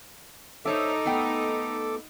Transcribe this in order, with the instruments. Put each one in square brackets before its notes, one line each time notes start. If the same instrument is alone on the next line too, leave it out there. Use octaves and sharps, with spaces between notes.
[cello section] D#4 [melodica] A4 D6 [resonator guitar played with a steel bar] C5 C#5 E5
[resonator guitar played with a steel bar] A3 B3 G5